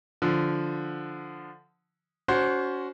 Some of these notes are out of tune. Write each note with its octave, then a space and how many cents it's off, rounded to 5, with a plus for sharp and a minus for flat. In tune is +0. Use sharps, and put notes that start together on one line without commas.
D3 +0 F3 +0
C#4 +30 F#4 +10 C5 +0